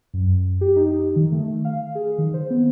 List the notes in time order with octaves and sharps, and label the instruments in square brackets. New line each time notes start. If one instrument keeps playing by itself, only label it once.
[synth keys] F#2
G4
D#4
D#3
A3
F5
G#4
D#3
C5
B3